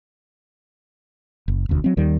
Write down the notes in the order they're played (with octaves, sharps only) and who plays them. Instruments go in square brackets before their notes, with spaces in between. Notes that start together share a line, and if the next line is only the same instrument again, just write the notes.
[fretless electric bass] F#1
E1 D2
F#3 C4
D#2 D#3 G3